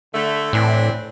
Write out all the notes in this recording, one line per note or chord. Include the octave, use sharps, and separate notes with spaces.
D3 A3
A2 E3 C4 D4